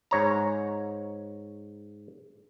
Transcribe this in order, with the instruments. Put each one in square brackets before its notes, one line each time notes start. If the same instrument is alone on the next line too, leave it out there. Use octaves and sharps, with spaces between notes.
[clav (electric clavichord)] G#2 C#5 A#5